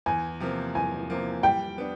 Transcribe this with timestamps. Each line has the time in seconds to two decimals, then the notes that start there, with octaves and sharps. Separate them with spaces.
0.06 E2 G#5
0.40 C3 F3 A#3
0.74 E2 G#5
1.10 C3 F3 A#3
1.43 G3 G5
1.78 B3 D4